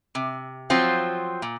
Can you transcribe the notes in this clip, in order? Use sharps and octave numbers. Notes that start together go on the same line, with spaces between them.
C3
F3 F#3 C4 F4
A#2